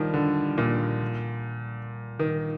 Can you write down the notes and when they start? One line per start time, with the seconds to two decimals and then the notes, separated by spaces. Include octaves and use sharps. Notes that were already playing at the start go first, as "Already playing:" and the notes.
Already playing: D#3 F3 G3
0.14 D3
0.58 A#2
2.19 D#3